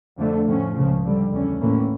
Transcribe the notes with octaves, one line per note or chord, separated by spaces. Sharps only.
F2 D3 A3
A2 F3 C#4
C#2 C#3 F3
F2 D3 G3
E2 D3 A3 C#4
A2 E3 A#3 C#4